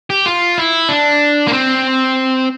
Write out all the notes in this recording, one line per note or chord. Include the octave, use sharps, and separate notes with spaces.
G4
F4
E4
D4
A#3
C4